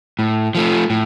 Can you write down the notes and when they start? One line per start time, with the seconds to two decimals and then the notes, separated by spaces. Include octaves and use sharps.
0.19 A2
0.55 F3 A3
0.90 A2